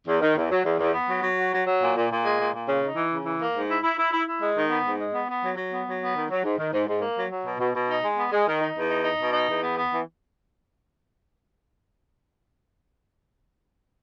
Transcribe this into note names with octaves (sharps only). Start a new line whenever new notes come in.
E2
D#3
E2
F#3
E2
E2
B3
F#3
F#3
F#4
F#3
F#3
A#2
A#2
A#2
G#3
A#2
A#2
C#3
D#4
E3
C#3
E3
A#3
G#2
E4
E4
E4
E4
E4
G#3
D#3
B3
G#2
G#3
B3
B3
F#3
F#3
B3
F#3
B3
D#3
F#3
G#2
D#3
G#2
G#2
A#3
F#3
F#3
B2
B2
B2
D#4
G#3
B3
G#3
D#3
D#4
E2
D#4
D#4
B2
D#4
E2
B3
B3
E3